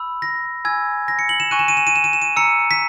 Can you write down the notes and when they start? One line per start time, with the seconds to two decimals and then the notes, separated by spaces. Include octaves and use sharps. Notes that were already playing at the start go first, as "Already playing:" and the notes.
Already playing: B5 E6
0.22 A#6
0.65 G#5 B5 E6 G#6
1.08 A#6
1.19 C#7
1.29 F#7
1.40 E7
1.51 G#5 C#6 F#6 D#7
1.59 E7
1.68 D#7
1.77 E7
1.87 D#7
1.95 E7
2.04 D#7
2.13 E7
2.22 D#7
2.36 A#5 E6 C#7
2.71 B6